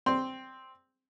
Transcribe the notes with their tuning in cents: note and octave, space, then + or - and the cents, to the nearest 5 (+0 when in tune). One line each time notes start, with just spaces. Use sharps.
C4 +0 D5 +0 C6 +0